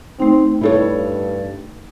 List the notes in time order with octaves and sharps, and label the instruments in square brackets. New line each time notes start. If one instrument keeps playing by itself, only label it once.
[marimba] A3 D#4 [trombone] C4
[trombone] G2 [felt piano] E4 A4 C#5